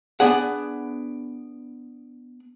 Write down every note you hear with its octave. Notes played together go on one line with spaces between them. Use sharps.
B3 D4 G#4 F#5